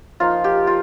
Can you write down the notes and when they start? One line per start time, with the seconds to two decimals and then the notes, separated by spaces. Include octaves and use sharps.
0.20 F3 A#3 D#4 F4
0.44 G4
0.67 F4